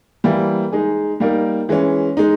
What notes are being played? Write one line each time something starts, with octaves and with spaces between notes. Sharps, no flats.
E3 G3 A#3
G#3 D#4 G#4
G3 A#3 D#4 A#4
E3 G#3 C#4
G#3 D#4